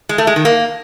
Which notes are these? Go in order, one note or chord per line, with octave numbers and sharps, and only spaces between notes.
G#3
A3
G#3
D#3
A#3